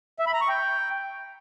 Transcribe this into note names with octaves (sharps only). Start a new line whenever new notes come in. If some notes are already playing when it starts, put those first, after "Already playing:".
E5
B5
A#5
C#6
G5